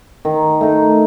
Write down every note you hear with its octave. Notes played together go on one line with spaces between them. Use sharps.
D#3
A3 D#4